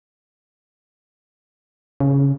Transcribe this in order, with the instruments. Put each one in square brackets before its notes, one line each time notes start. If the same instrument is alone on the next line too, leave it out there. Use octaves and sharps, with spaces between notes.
[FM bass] C#3